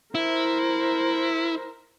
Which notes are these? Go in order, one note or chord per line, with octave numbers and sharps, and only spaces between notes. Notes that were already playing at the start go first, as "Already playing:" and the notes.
E4 A#4 C5